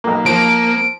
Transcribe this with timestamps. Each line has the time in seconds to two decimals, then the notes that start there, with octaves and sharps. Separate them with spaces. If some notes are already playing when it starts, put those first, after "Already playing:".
0.04 B1 A#3
0.26 F3 A#3 D7